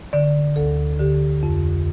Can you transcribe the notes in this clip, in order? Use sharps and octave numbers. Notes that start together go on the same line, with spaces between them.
D3 D5
D2 A4
D3 G4
F2